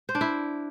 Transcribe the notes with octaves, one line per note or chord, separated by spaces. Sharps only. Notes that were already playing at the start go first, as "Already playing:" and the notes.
C5
D4
E4